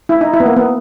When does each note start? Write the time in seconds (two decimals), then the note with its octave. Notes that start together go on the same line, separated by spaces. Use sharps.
0.09 E4
0.21 D#4
0.34 E4
0.40 B3
0.46 A#3
0.57 B3